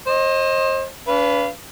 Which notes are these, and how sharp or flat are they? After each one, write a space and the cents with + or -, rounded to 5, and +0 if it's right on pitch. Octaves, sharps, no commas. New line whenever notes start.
C5 +35 D#5 +0
D4 -45 B4 +5 F5 -30